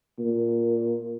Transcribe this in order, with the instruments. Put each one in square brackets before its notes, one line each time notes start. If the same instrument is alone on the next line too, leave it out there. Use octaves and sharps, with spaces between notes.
[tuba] A#2